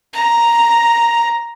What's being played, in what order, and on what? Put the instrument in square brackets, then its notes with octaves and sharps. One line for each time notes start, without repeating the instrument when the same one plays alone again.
[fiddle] A#5